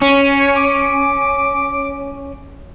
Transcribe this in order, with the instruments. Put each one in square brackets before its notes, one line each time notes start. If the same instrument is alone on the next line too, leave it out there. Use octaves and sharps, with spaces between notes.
[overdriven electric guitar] C#4
[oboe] C#5
D6